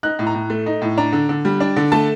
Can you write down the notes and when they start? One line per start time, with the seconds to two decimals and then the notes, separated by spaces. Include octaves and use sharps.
0.03 D#4 F#6
0.19 A2
0.27 A#5
0.35 A2
0.50 A3
0.66 D#4
0.82 A2
0.97 D4 A#5
1.13 D3
1.29 D3
1.45 G3
1.60 D4
1.76 D3
1.92 A3 A5